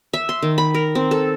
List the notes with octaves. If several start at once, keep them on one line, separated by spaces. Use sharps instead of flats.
E5
C6
D#3
B5
A#4
C4
A4